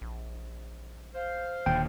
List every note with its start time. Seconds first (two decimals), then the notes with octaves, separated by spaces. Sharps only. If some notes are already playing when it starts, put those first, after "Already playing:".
0.02 A#1
1.15 C5 F5
1.66 D#1 D#2 A#2 D3 G5